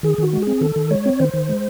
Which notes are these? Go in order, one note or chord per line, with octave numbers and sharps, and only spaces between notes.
D#3 G#4
D#3 F#4
G#3
C4 G#4
D#3 A4
D#3
G#3 C#5
C4
D#3 C5
D#3
G#3